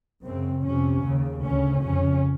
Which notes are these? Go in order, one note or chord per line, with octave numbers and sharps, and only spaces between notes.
F#2 C#3 C4
F2 C3 C#4
D#2 C#3
D2 C#3 C#4
F2 C#3 C#4